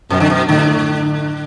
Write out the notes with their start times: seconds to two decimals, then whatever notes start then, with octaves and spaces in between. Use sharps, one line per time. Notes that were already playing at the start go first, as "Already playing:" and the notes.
0.10 F#2 B2
0.20 D3
0.30 B2
0.48 A2 D3